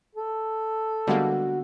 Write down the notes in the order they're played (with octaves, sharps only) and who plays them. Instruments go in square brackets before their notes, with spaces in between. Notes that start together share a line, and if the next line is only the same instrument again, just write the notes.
[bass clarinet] A4
[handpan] D3 B3 [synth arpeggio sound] G3 G#3 A#3 [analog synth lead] F#4